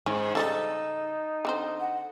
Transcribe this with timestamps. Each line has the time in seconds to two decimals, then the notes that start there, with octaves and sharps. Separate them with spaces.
0.06 G#2 C#4
0.35 C#3 F#3 G3 D#4 A4
1.45 D3 C4 C5
1.79 F#5